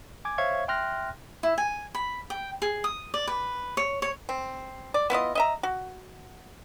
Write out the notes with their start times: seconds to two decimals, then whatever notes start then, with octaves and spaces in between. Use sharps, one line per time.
0.25 G#5 D6 G#6
0.38 C5 C#5 E5 F5 C#6 G#6
0.68 E5 G5 C6 F6 F#6 A#6
1.43 E4
1.58 G#5
1.95 B5
2.30 G5
2.62 G#4
2.84 D#6
3.14 D5
3.27 B4
3.77 C#5
4.02 C#5
4.29 C4
4.94 D5
5.10 B3 E4 F4 D#5
5.35 D#5 E5 A#5
5.63 F#4